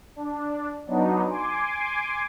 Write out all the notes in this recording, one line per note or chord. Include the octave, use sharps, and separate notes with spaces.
D4
F#3 B3 D4 D#4
G#5 C6 D6